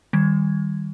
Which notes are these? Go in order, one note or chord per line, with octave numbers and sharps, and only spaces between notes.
D#3 G3 G#6